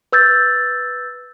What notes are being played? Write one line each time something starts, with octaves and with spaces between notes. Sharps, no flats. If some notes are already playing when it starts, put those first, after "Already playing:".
B4 E6 G6 A6